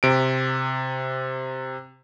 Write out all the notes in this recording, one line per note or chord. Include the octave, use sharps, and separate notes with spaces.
C3 D7